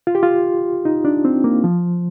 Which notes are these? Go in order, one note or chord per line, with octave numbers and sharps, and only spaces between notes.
F4
G4
F4
D#4
D4
C4
A#3
F3